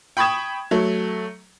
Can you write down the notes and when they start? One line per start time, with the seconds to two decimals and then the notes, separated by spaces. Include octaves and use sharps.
0.17 G5 B5 C#6 D#6 G#6 E7
0.71 F#3 A3